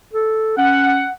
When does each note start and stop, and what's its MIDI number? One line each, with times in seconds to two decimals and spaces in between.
0.13 0.56 69
0.57 1.06 61
0.57 1.11 78